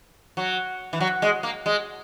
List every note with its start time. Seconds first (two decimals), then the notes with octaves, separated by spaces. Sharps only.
0.37 F#3
0.93 E3
1.01 F#3
1.22 G#3
1.43 A#3
1.66 G#3